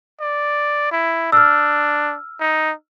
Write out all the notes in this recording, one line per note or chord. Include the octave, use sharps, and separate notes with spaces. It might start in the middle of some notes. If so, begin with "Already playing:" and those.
D5
E4
D4 E6 F6
D#4